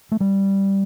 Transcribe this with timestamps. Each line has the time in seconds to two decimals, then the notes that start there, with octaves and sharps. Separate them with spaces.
0.12 A3
0.20 G3